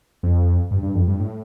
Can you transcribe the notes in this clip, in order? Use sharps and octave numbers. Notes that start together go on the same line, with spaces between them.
F2
G2
G2
F2
G2
A2